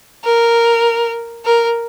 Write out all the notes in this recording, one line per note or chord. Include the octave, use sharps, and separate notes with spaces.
A#4
A#4